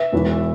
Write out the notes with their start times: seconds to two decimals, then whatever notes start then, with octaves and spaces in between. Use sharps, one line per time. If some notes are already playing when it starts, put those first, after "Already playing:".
Already playing: B4 E5
0.12 E1 E2 E3